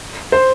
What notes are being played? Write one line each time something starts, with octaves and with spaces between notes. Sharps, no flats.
C5